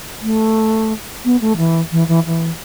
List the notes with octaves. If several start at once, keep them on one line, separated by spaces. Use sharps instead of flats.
A3
B3
A3
E3
E3
E3
E3